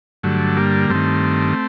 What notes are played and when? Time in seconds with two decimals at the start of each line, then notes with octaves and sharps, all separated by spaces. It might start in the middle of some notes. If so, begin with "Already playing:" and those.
0.23 G2 D3 F#3 A3
0.57 G3 A#3
0.90 G2 D#3 A3 C4